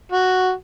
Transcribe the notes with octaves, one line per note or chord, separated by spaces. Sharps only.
F#4